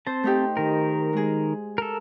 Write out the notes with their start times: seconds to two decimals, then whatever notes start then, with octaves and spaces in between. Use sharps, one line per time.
0.07 C4 C5 A5
0.23 A3 D#4 G4
0.57 D#3 A#4
1.13 G#3 G#4
1.78 A4 A#4